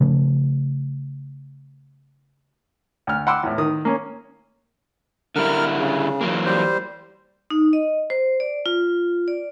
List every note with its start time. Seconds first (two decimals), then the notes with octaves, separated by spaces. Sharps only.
0.01 C#3 F3 A3
3.07 D2 F6
3.27 F#5 G5 B5 C6 D6 E6
3.43 E2 A2
3.58 D#3 D#6
3.85 A#3 C#4
5.36 D3 G3 E4 A#4 F6
5.79 C#3
6.21 E3 F#3 A#3
6.46 G3 C5
7.50 D#4
7.73 D#5
8.10 C5
8.40 D5
8.66 F4
9.28 D5